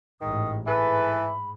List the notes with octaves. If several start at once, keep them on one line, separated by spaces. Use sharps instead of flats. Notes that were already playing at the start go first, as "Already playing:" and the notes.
A1 G#2 D#3 D#6
G#2 E3 G#4 A4 B4 B5